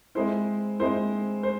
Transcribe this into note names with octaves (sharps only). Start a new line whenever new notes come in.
G#3 C4 E4 C5
G#3 C4 E4 C5
C5